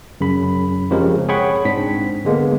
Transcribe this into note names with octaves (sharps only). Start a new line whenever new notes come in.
F#2 C#3 B5
C#3 F3 G#3 C4 G4 A#4
G#4 C#5 F#5 G5 B5 C#6
G#2 C4 D4 B6
D3 G#3 A#3 B3